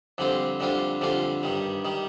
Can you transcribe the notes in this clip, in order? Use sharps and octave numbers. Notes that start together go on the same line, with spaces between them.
F2 D3 G3 C4 F4
F2 D3 G3 D4 F4
F2 D3 G3 D4 F4
G2 D#3 G3
D#3 G3